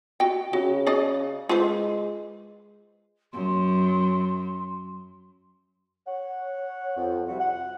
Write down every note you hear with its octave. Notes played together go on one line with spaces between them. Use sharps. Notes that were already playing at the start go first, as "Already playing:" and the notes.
F#4 G5
C#3 F#4
G#4 D5 D#5
G#3 F4 B4 C5
F#2 C6
C#5 F#5
F2
C3 G3 E4 F#4
F#5